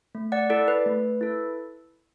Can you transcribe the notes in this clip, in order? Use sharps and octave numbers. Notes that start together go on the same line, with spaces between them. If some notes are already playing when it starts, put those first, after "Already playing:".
A3
D5 F#5
E4 A4 D5
B4
A3
E4 A4